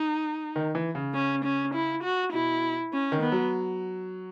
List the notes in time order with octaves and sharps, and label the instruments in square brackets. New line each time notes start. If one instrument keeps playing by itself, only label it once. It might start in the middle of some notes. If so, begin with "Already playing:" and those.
Already playing: [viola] D#4
[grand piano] D#3
E3
C#3
[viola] C#4
C#4
E4
F#4
[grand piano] B2 [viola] E4
[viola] C#4
[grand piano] D#3
[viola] B3
[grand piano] F#3